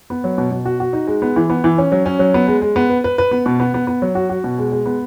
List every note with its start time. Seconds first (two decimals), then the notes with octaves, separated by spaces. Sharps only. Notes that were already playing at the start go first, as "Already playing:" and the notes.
0.10 B3
0.24 F#3
0.38 B2
0.51 B2
0.65 F#4
0.80 F#4
0.93 D#4
1.07 G#3
1.22 B3
1.36 E3
1.50 B3
1.64 E3
1.78 C#4
1.92 F#3
2.06 C#4
2.19 F#3
2.34 B3
2.48 G#3
2.62 G#3
2.76 B3
2.90 B4
3.04 B4
3.18 B4
3.31 B3
3.46 B2
3.60 B3
3.74 B3
3.87 B3
4.02 F#3
4.15 F#4
4.30 F#4
4.44 B2
4.58 G#3
4.72 G#3
4.86 B3